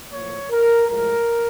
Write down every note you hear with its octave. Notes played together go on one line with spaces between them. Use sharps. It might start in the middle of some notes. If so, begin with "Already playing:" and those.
A2 F3 A#3 C#5
A#4
A2 F3 G#3 A#4